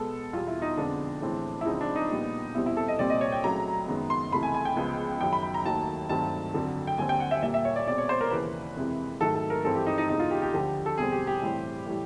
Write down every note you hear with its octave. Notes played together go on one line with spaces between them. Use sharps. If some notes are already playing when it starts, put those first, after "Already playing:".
Already playing: B2 G#3 B3 A4
E2 B2 G3 F4
E4
D#4
F2 D3 F3 G#3 B3 D4
A2 E3 G#3 C4
E4
C#2 C#3 F3 G#3 C4 D#4
D4
D#4
A#2 G3 B3
E2 B2 G3 C4 E4
E4
A4
D#5
C2 A#2 G3 C4 D5
D#5
C#5
G5
C#2 C#3 F#3 A3 A#5
F#2 D#3 G#3 B3
C6
C#2 C3 E3 A3 B5
G#5
G#5
G5
C#2 C#3 F3 G#3 B3
F#2 D#3 F#3 G5
B5
B5
A#5
D#2 D#3 F#3 A3 A5
G2 D#3 F#3 A3 C4 A5
F2 D3 F#3
G5
D#2 D3 G3 C4 G#5
G5
F#5
E5
A#2 G3 A#3 E5
E5
C#5
D5
B2 G#3 C4 D5
C#5
C5
A#4
D#2 C#3 E3 B4
F2 C3 E3 G#3
G#2 D#3 F#3 A3 A4
A4
A#4
G2 E3 G#3 C4 A4
G4
D#4
D#4
E2 C#3 E3 G#3 D#4
F4
G4
G4
D2 D3 F3 G4
A4
E2 B2 G3 C4 G#4
G4
G4
A2 E3 G3 C4
A2 E3 G3